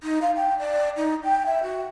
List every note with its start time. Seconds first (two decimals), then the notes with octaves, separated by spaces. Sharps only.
0.03 D#4
0.22 F5
0.36 G5
0.59 D5
0.96 D#4
1.24 G5
1.46 E5
1.63 F#4